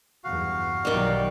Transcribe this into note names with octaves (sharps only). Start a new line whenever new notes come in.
F#1 E2 G2 F#4 F5
B1 D#3 E3 F#3 G3 D5